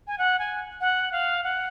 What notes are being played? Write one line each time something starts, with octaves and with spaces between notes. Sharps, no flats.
G#5
F#5
G#5
F#5
F5
F#5